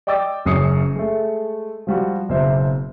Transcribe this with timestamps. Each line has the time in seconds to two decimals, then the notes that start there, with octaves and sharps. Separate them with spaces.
0.07 D5 D#5 G5 D6 E6 A6
0.45 F#1 F#2 D#6 C7 C#7
0.96 G#3 A3
1.87 F3 G3 F#4
2.29 F#1 B2 C5 E5